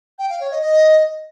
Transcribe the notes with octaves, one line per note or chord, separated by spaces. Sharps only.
G5
F5
C#5
D#5
D#5